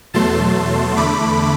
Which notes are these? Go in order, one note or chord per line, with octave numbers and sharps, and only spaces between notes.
E2 B2 F#3 A3 A5 C6
E2 D3 A3 B5 D6